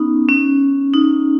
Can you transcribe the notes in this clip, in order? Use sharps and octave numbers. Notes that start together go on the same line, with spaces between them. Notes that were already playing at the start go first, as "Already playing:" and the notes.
Already playing: B3 C#4 D#4
C#4
D#4